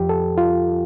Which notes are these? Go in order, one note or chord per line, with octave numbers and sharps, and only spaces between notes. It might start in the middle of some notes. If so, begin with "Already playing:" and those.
Already playing: F2 F3 G4
A4
F4